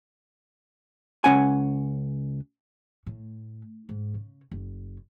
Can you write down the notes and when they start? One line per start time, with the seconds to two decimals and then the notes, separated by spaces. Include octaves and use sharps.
1.24 C#2 D#3 C#4 F#5 G#5
3.06 A2
3.89 G#2
4.14 C#3
4.51 F#1